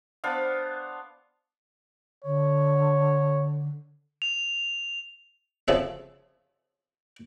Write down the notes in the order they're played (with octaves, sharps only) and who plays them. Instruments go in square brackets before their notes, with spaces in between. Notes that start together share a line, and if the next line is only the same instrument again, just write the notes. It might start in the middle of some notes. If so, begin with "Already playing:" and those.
[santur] B3 D4 C5 F5
[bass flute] D3 [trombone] C#5
[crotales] F7
[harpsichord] C#3 F3 A4 E5